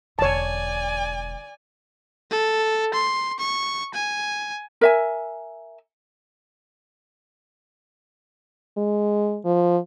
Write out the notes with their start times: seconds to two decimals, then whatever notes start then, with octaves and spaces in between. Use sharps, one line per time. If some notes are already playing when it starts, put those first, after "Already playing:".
0.19 E1 D3 C#5 D5 G#5 A5
2.31 A4
2.94 C6
3.39 C#6
3.94 G#5
4.81 A#4 E5 G#5
8.77 G#3
9.45 F3